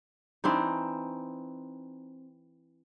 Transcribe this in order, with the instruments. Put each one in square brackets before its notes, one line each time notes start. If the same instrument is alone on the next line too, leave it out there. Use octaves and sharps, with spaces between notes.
[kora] E3 C4 D4 D#4